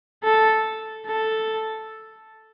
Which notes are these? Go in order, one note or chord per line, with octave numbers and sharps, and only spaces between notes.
A4
A4